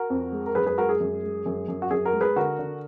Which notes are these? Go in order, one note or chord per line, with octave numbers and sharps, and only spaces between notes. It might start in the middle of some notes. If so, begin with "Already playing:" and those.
Already playing: F#4 A#4
F2
G#3
A#4
F#2 G#4 B4
G#4 B4
G#3 F#4 A#4
G#4
F#2
G#3
F#2
F#2
F#4
F#2 G#4
F#4 A#4
G#3
G#4 B4
D3 F#4 A#4
D3